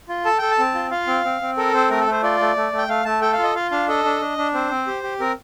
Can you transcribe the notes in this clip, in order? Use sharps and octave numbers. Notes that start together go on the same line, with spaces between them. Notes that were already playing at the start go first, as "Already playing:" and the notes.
F4
A4 A5
A4 G5
A5
C4
F4
F4 F5
C4
C4
C4
A4 A#4
C4 C5
A3 A#4
A4
A3 C5
F4 D5
A3
A3
A3
G5
A3 F5
A3 A5
A4 G5
F5
F4 D#5
F4 F5
D4 F5
A4 D#5
D4
D4
D4
C4 C5
C4
G4
G4
C4 A#4